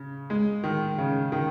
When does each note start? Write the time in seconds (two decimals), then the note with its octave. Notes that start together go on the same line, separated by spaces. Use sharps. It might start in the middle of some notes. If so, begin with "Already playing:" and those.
Already playing: C#3
0.30 G#3
0.64 D#3
0.98 C#3
1.32 D#3